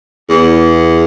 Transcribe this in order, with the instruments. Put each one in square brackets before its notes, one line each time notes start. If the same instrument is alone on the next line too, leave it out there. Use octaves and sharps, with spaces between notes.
[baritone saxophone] E2